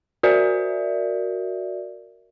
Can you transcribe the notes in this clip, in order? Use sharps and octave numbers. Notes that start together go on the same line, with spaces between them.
F#4 A#4 D5 E5